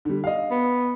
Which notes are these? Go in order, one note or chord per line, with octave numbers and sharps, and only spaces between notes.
D3 G3
D#5 F5
B3